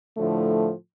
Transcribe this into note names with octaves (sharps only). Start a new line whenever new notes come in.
A2 D3 F3 A3